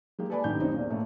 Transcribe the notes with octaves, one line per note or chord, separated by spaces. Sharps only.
G#3 A#3 G4
A4 B4 D5 G#5 B5
A1 D#3 G4 G6
F#2 A2 C4 D#4
E2 A#2
A2 A3 A#3